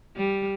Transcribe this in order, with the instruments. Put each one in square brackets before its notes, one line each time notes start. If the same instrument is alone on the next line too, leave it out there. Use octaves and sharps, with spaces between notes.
[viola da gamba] G3